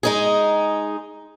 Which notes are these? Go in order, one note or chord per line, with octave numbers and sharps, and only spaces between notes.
G#3 D#4 G#4